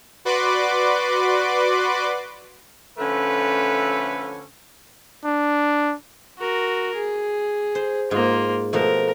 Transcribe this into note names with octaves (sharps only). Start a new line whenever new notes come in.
F#4 B4 D5 C6 D6
D3 F3 A3 C#4 A4 B4
D4
F#4 A#4
G#4
C5
G#2 A#3 F4
B2 F3 A3 A#4